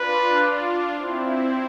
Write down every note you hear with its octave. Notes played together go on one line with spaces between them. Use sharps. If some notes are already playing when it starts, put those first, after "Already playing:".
Already playing: D4 F4 B4
C4 E4